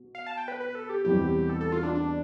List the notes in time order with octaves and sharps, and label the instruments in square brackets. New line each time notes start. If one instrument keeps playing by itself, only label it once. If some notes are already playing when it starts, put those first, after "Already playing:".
Already playing: [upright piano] B2
[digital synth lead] F5
A5
G5
B4
B4
A4
G4
[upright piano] E2 B2 G3 C4 E4 [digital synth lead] G4
[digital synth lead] A4
A4
F4
D4
D4